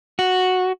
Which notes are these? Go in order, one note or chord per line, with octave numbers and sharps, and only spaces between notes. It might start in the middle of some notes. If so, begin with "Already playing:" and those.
F#4